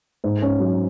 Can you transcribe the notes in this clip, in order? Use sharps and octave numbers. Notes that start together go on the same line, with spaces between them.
G#2
C#4
F#3